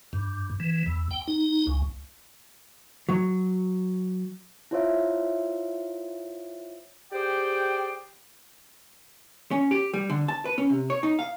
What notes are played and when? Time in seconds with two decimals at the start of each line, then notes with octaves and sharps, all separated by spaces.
0.13 G2
0.60 E3
0.86 E2
1.11 G5
1.27 D#4
1.67 C#2
3.09 F#3
4.71 E4 F4 C5 C#5 E5 F5
7.12 G4 G#4 C5 D5 G5
9.51 C#4
9.71 G4
9.94 G3
10.10 D3
10.28 A5
10.45 B4
10.58 C#4
10.70 C3
10.90 C#5
11.03 D#4
11.19 F5